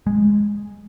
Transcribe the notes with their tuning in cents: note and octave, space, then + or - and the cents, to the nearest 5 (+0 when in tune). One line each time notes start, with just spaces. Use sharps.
G#3 -5